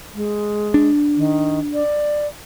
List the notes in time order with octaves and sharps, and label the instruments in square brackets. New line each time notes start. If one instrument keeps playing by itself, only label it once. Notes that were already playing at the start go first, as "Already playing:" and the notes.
[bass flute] G#3
[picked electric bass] D4
[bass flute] D#3
D5